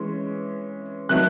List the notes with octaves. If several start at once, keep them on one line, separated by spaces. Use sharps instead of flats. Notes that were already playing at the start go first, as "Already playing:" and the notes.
Already playing: E3 G#3 C#4
D#3 F#3 A3 F#6